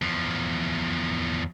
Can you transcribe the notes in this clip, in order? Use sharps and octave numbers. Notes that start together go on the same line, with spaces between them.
E2 F3